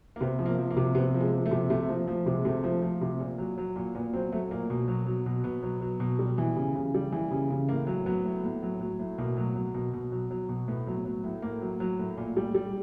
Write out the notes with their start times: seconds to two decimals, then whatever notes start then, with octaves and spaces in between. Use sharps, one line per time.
0.16 A#3
0.21 C3 B3
0.39 F3
0.46 A#3
0.58 F3
0.70 A#3
0.77 C3
0.95 C3 B3
1.14 F3
1.21 G#3
1.32 F3
1.46 A3
1.51 C3
1.70 C3 A3
1.89 F3
2.08 F3
2.26 C3
2.34 G#3
2.45 C3 A3
2.64 F3
2.82 F3
3.01 C3
3.20 A#2
3.38 F#3
3.58 F#3
3.76 A#2
3.95 A#2 B3
4.13 F#3 C4
4.32 F#3 A3
4.51 A#2 A#3
4.70 B2
4.88 F#3
5.06 F#3
5.26 B2
5.44 B2 B3
5.63 F#3
5.81 F#3
6.00 B2
6.19 G3
6.38 E3
6.57 C#3
6.75 C#3
6.94 G3
7.12 E3
7.31 C#3
7.50 C#3
7.69 A2 A#3
7.87 F#3
8.06 F#3 B3
8.25 A2
8.44 A2
8.62 F#3
8.81 F#3
8.99 A2
9.18 B2 A#3
9.37 F#3
9.56 F#3
9.74 B2
9.93 B2
10.12 F#3
10.31 F#3
10.49 B2
10.68 A2 B3
10.87 F#3
11.05 F#3
11.24 A2
11.42 A2 A#3
11.61 F#3
11.80 F#3
11.99 A2
12.17 A#2
12.37 G3
12.55 G3